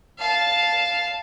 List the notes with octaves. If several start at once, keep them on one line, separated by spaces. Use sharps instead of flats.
F5 A5